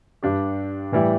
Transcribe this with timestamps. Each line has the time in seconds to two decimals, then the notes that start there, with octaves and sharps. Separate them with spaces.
0.23 G2 G3 D4 G4
0.92 A2 E3 G3 E4